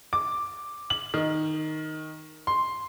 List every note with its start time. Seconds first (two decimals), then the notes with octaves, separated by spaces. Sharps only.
0.13 D6
0.90 F#7
1.14 D#3
2.47 C6